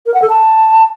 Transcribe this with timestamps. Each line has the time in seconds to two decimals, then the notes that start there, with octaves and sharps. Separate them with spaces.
0.06 A#4
0.14 F#5
0.22 A4
0.30 A5